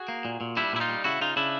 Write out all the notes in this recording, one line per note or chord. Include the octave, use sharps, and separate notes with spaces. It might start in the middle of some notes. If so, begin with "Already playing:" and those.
Already playing: F#4 G#4
A#3
A#2
A#2
G3 D4 E4
A#2 E4
D#4 F4
G3
C#3 E4 F#4
C#3 D#4 F4
C#3 D4 E4